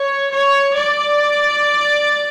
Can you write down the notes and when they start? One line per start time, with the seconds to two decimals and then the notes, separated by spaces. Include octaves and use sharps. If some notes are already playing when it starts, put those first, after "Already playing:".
Already playing: C#5
0.32 C#5
0.75 D5